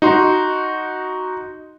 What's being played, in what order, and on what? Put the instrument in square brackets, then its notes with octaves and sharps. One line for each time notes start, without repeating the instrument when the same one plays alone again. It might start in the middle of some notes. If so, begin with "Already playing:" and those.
[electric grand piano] D#4 F#4 C6